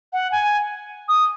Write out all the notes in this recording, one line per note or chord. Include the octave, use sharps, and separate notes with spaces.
F#5
G#5
D#6